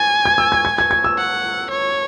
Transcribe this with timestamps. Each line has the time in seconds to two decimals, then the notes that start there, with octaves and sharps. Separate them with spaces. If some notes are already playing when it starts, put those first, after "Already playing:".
Already playing: G#5 A6
0.26 G#6
0.38 E6
0.52 G#6
0.65 G#6
0.78 G#6
0.91 G#6
1.04 E6
1.18 F#5
1.71 C#5